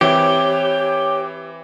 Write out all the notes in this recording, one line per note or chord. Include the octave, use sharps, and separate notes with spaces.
E3 C4 E4 G4 C#5